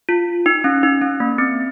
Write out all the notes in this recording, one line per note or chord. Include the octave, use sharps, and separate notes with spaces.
F4
D#4
C#4
D#4
C#4
A#3
C4